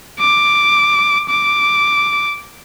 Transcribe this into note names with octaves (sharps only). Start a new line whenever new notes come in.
D6
D6